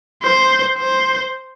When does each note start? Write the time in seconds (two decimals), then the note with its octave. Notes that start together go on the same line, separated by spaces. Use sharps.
0.23 C5
0.78 C5